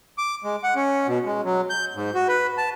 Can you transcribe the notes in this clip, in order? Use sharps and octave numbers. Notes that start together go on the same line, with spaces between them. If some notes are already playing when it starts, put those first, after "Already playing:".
D6
G#3
F#5
C#4
B2
G#3
F#3
G6
G#2
F#4
B4
A5